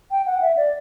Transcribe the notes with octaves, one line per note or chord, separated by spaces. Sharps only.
G5
F#5
E5
D5